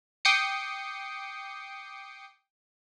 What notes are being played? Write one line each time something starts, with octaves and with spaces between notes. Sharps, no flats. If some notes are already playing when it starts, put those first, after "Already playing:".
G5 D6 D#6 C7 C#7